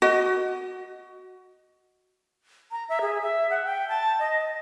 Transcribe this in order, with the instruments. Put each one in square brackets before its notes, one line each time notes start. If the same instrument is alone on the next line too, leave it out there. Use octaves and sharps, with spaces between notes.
[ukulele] F#4 D#5
[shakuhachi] A#5
E5
G#4
E5
F#5
G5
A5
D#5